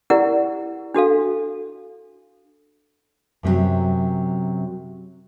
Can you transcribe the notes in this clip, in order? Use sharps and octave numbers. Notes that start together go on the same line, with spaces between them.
E4 G4 A#4 D5 F#5
D4 F#4 A4 F5
F#2 C3 D#3 F#3